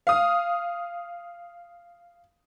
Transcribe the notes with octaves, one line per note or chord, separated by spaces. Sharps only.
F5 D#6